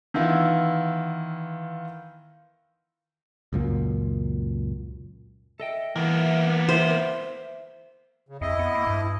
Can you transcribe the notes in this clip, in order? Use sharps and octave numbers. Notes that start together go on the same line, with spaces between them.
D#3 E3 B3 E4 F4
C#2 F#2 A#2
A4 D#5 E5 G5
E3 A#3 B3 E5
C5 E5
C#3
F2 E4 D#5
B3
A#3
G2